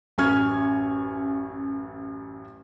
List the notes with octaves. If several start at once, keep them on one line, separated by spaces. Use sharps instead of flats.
A1 F#2 G#5 C#6 F6 G#6